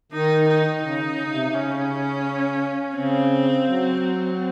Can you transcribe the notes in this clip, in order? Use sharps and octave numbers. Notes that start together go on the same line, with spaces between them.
D#3 D#4
D#4
C#3 D#4
C#3
C3
C#3 C#4
C#3 C4
F#3